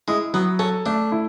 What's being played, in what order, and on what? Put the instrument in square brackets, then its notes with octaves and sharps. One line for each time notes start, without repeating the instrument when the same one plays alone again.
[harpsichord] G#3 [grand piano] E4
[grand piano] F#3 [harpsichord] B3
[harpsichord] C#4 [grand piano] A4
[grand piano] A3 [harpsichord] D4
[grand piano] E4